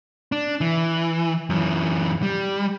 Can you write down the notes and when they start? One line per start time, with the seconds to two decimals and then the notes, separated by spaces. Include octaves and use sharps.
0.32 D4
0.61 E3
1.50 F#2 E3
2.23 G3